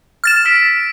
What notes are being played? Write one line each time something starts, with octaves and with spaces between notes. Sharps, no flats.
F6 A6 E7
E6 B6 D7